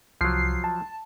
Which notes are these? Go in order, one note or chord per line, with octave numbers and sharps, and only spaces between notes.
C2 F3 F#3 C7
A5